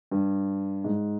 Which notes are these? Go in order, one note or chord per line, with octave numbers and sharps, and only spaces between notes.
G2
G#2